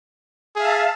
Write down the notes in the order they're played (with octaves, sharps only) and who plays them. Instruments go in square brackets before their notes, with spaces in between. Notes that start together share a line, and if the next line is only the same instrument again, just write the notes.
[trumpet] G#4 [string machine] E5 F5 A5